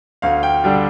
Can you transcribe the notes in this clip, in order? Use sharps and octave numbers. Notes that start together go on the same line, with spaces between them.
D2 F5
G5
D3 G3 D4